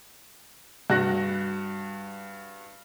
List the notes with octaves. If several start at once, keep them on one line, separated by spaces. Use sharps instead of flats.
G2 F#4 F#6 A#6